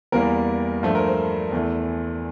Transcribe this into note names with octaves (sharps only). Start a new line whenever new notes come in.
E2 E3 G3 A#3 A#4
G2 F3 A3 C5
A#4
C5
E2 E3 A3